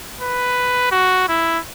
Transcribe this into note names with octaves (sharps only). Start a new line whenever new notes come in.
B4
F#4
E4